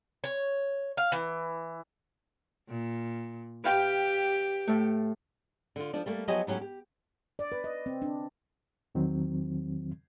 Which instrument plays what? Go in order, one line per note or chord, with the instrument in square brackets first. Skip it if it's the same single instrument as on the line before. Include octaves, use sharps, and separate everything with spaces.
[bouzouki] C#5
F5
E3
[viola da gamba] A#2
[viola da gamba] G4 [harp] B4 F5 G5
[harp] A2 A3
[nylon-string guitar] D3 F4
F3 D4
G3 A3 A#3
F3 F#3 B3 G4 D#5 G#5
A2 F#3 C#4 G4
G4
[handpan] D5
B4
D#5
C4
D4
[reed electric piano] E2 D#3 F#3 C4